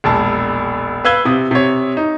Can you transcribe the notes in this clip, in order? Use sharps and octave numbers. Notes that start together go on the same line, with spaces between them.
E1 A#1 A5
B4 F5 E6 G#6 G7
C3 D#6
C3 C#5
D#4